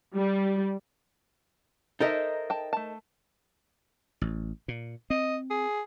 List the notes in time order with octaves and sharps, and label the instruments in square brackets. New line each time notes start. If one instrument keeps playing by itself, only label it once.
[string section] G3
[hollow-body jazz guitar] D#4 A4 A#4 [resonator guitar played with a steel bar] C5 D#5 E5
[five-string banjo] G5 A5
A3 A5
[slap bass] A1
A#2
[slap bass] C4 [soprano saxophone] D#5
[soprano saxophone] G#4